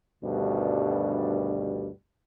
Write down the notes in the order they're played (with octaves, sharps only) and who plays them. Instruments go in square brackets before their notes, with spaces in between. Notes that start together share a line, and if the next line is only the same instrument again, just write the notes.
[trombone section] D2 G2 B2 D#3 G3 D4